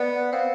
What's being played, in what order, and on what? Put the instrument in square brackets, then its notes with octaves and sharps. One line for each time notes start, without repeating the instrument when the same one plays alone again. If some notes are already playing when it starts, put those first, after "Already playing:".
Already playing: [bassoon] B3 [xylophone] D5
[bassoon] C4 [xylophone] F5